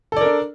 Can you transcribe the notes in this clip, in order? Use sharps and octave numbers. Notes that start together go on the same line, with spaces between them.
D4 A4 A#4 D5